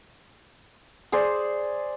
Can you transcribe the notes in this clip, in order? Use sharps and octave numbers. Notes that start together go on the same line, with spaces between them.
G#4 C5 D5